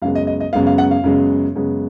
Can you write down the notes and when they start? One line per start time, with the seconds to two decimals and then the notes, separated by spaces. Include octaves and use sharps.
0.02 F#2 C#3 G#3 B3 F5
0.15 D#5
0.27 D#5
0.41 D#5
0.53 F#2 C#3 G#3 B3 F5
0.67 F5
0.78 F#5
0.91 F5
1.04 F#2 C#3 G#3 B3
1.55 F#2 C#3 G#3 B3